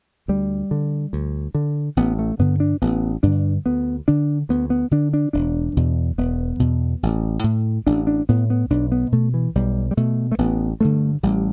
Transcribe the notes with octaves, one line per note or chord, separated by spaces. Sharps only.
D2 G3
D3
D2
D3
A1 B3
A3
G2 D3 B3
D4
A1 B3
G2 D3 D4
D2 B3
D3 D4
D2 B3
B3
D3 D4
D4
E1 D4
E2 B2
E1 B3
E2 B2
A1
A2
A1 D4
D4
A2 B3
B3
B1 D4
B3
B2 A3
E3
B1 G3
G3
B2 A3
A3
A1 B3
G2 D3 A3
A1 G3